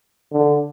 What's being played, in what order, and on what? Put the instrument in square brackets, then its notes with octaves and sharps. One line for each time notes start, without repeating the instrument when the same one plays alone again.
[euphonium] D3